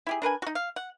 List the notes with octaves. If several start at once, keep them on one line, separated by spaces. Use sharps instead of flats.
E4 G4 G#4
D4 A#4 B4 G#5
D#4 F#4
F5
F#5